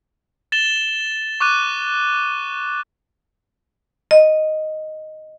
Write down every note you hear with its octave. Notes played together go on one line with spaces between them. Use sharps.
A6 E7 G7
C#6 D6 F#6 D#7
D#5